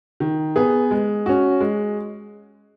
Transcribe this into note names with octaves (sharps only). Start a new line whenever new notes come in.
D#3
B3 G#4
G#3
C#4 F#4
G#3